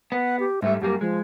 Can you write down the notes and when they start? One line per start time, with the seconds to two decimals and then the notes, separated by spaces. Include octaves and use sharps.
0.12 B3 F#5
0.40 G4
0.62 G#2 G3 A3 E5
0.82 F#2 G3 A#3 G4
1.01 F3 G#3